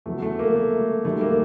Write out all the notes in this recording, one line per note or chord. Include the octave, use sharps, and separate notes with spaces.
E2 C#3 F#3 A3
A3
A#3
A3
F#2 D#3 G3 A3
A#3